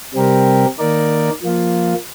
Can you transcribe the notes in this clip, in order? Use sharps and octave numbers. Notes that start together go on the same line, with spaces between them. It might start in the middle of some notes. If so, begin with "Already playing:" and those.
C3 G3 C4 G4 A#4
D#3 A#3 D#4 A#4 D5
F3 A#3 F4